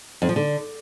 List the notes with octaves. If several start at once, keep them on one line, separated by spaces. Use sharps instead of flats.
F2
F3
D3